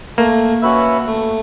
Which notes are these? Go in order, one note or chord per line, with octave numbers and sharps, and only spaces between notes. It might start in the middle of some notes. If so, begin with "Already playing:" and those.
A3 A#3
C#4 F#4 B4 E5
A3